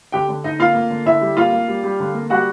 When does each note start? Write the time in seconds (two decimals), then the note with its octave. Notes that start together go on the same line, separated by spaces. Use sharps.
0.12 D3 G4 G5
0.29 D3
0.44 D3 D#4 D#5
0.59 A#3 F4 F5
0.75 A#3
0.90 D3
1.06 D3 E4 E5
1.21 G3
1.37 A#3 F4 F5
1.52 A#3
1.68 G3
1.84 G3
2.00 D3
2.14 A#3
2.30 G3 F#4 F#5